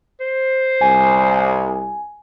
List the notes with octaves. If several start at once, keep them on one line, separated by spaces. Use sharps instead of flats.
C5
C2 G#5